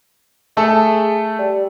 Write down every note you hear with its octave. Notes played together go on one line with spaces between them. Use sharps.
A3 G#4 A4
G3